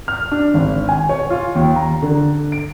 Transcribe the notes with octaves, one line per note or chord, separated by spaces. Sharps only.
F6
D4
G#1
G#5
C#5
F4
D#2
A#5
D3
D7